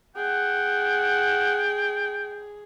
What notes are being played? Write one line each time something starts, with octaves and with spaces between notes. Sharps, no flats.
G#4 F#5 G5